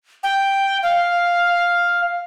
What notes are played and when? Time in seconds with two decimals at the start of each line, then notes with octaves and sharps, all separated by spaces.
0.23 G5
0.83 F5